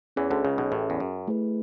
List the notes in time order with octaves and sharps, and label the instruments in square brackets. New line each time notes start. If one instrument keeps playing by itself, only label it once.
[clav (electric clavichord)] E2 E3 [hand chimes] C#4 G#4 C#5
[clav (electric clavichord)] D2 D3
C#2 C#3
B1 B2
A1 A2
E2
F#2
[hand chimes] A3 E4 G#4 B4